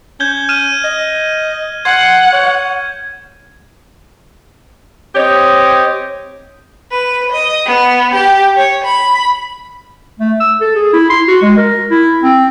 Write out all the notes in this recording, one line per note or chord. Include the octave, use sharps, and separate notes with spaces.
C#4 G6 G#6 G7
F6 D#7 E7
D#5
F#5 C6 G#6
C#5
C4 G4 C#5 D#5
B4
D#5
B3
G4
C#5
B5
A3
E6
A4
G#4
E4
C6
F#4
G#3
A#4
E4
C4